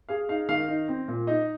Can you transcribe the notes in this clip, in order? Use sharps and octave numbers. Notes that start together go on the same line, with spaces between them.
G#4 F5
D#4 F5
D#3 F5
D#4
C4
A#2
D#4 D#5